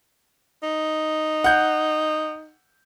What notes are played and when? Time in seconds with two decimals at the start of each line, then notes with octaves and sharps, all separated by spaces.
0.63 D#4
1.44 F#5 G6